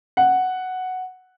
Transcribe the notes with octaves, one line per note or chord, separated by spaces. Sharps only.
F#5